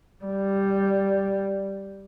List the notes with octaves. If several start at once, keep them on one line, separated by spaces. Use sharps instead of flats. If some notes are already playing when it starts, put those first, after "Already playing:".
G3